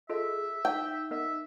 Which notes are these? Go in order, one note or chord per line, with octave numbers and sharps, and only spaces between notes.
F4 G#4 A4 D#5 E5
D#4 G5
B3 A#4 D#5 E5